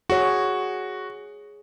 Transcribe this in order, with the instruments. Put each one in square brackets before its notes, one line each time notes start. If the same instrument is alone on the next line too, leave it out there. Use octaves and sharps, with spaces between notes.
[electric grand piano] F#4 [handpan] G#4 C#5